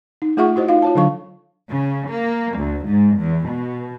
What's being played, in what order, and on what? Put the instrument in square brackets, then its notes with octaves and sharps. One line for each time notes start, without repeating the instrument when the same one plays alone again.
[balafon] D#4
A3 F4 G#4 E5 F#5 C#6
E4 F#4 C5 D#5
D#4 F4 F5
F4 C#5 A5
D3 F#3 D4 A4 F5 C#6
[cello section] C#3
A#3
D2
G#2
E2
B2